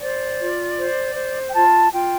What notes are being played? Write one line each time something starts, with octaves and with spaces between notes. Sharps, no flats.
C5 D5
F4
C5
C5
G5
F4 A5
F4 G5